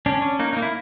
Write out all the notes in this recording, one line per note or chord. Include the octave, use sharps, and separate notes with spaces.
C#4 D4
C#4
A#3 D#4
A#3 D#4
E4